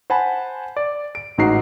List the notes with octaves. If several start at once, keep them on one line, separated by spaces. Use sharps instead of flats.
C5 F#5 G#5 A5 B5
D5
D7
A1 G#2 D#4 F#4 A#5 C7